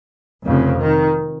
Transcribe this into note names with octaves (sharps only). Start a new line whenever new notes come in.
F1 F2 C#3
D#3